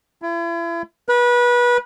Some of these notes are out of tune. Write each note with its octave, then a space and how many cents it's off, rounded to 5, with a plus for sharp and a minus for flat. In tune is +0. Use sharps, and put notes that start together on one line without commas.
E4 +40
B4 -25